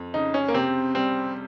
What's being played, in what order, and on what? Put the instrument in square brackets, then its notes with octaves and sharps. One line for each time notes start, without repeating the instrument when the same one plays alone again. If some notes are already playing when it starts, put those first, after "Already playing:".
Already playing: [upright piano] F2
[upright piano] C#3 [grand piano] D#4
[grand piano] C#4
A#3
[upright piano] C3 [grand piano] C4
[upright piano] G3 [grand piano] C4